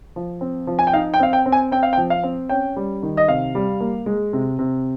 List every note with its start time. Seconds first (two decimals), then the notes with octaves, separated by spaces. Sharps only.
0.16 F3
0.41 C4
0.67 F3
0.79 G#5
0.87 G5
0.93 D#4 F5
1.14 G5
1.20 C4 F5
1.33 G5
1.46 C4
1.52 G#5
1.72 C4 G5
1.83 F5
1.93 G5
1.97 F3
2.10 F5
2.23 C4
2.49 C#4 G5
2.76 G3
3.03 D#3
3.17 D#5
3.28 C3 F5
3.55 G3
3.80 A#3
4.06 G#3
4.33 C3
4.59 C3